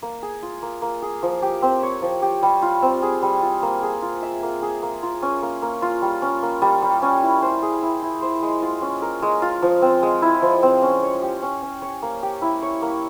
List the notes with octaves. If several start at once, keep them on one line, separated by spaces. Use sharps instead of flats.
A#3
G#4
F4
A#3
A#3
G#4
F3
G4
C4
C#5
F3
G4
G3
F4
C4
G#4
G3
F4
A#3
G#4
F4
E5
A#3
G#4
A#3
F4
C#4
A#3
A#3
F4
G3
C#4
A#3
G3
G3
C#4
E4
C5
G#4
E4
E4
C5
G#3
F4
C#4
A#4
G#3
F4
F3
C4
G#3
E4
F3
C4
C#4
C#5
G4
C#4
C#4
C#5
A#3
G4
E4
C#5
A#3